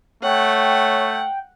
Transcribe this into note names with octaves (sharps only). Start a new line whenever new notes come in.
A3 C#5 F#5 G5